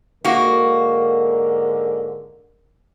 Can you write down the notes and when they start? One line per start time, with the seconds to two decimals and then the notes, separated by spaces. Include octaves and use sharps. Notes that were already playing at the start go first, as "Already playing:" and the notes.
0.25 G#2 D3 A#3 F#4 A#4